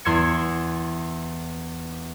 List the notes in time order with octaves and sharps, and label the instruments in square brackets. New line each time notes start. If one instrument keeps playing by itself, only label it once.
[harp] E2 C6 E6 G#6 C#7